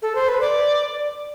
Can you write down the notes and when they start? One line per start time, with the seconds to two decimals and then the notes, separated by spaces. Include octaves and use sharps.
0.02 A4
0.15 C5
0.29 B4
0.41 D5